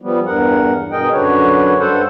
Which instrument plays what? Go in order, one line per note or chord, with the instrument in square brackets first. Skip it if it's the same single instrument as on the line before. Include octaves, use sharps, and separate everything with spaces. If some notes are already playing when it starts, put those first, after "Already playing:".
[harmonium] F3 G3 B3
E2 G2 A#4 F#5
G2 B2 G#4 A#4 D#5 G5
F#2 D3 D4 F#4 B4 C#5
G2 A4 C5 F#5